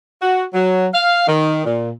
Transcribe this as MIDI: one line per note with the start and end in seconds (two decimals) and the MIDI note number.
0.21 0.44 66
0.53 0.87 54
0.93 1.22 77
1.27 1.63 51
1.65 1.89 46